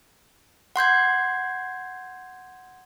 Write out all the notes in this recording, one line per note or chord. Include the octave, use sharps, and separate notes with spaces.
F#5 C6 G6 G#6